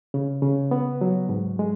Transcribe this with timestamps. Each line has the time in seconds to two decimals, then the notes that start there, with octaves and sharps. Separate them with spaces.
0.14 C#3
0.42 C#3
0.71 B3
1.01 F#3
1.29 G#2
1.59 G#3